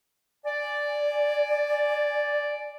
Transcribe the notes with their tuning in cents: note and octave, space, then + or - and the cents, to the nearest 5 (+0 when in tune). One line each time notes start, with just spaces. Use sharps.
D5 +0 G#5 +10